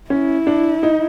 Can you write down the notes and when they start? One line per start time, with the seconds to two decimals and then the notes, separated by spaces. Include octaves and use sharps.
0.10 C#4 E4
0.47 D4
0.83 D#4